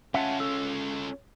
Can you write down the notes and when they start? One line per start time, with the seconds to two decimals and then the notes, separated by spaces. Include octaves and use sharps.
0.14 C#4 F4 E5 F#5 A5
0.40 A4